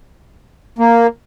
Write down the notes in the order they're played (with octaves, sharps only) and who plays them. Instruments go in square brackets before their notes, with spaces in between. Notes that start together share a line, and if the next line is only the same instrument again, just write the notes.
[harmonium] A#3